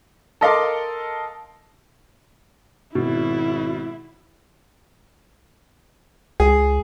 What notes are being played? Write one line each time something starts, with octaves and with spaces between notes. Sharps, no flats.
A4 A#4 D#5 F5 C6 D6
G#1 B2 E4
C#2 G#4